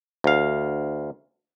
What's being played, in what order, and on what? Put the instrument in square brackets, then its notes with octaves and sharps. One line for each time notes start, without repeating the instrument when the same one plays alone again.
[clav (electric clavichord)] D2 F5